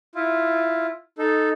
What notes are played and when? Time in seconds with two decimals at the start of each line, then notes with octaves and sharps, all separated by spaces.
0.15 E4 F4
1.18 D#4 A4